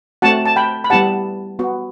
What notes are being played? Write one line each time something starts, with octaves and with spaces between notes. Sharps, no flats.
A3 C4 F#4 F#5 A5
A5
G5 B5
B5
G3 B3 E4 G4 F#5 A5
B3 F#4